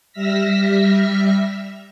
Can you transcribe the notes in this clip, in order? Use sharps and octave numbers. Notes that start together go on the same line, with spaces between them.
G3 E5 E6 F6 A#6 B6